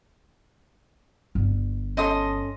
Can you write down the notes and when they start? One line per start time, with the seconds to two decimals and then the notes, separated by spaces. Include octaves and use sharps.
1.35 G1
1.97 C#4 A4 D#5 C6 D#6